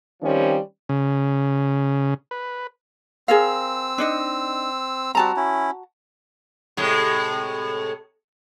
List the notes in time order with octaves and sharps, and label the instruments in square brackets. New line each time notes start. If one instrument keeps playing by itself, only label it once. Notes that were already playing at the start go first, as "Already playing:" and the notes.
[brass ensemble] D#3 F3 G3 C4 C#4
[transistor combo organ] C#3
B4
[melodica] C4 E6 [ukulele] G#4 A#4 F5
[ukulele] D4 D#4 D#5
[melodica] G3 C4 [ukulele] F#4 A5 A#5
[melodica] C#4 E4
[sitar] A2 C3 G#3